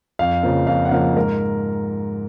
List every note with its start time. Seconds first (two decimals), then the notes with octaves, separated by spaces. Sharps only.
0.19 F2 F5
0.43 C#3 F3 A#3
0.67 F2 F5
0.85 F#5
0.91 C#3 F3 A#3 F5
1.16 G#2 A#4